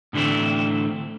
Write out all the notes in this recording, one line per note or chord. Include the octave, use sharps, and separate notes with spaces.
A2 D3 E3 A3 C4